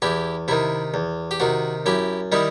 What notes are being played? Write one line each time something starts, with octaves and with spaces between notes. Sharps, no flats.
E2 E4 G4
C3 D#3 E4
E2
G4
C3 D#3 F#4
F#2 E4 G4
D#3 G3 D#4 E4